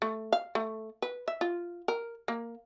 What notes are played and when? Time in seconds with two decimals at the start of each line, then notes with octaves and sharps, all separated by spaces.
0.02 A3
0.32 F5
0.55 A3
1.02 B4
1.28 E5
1.41 F4
1.88 A#4
2.28 A#3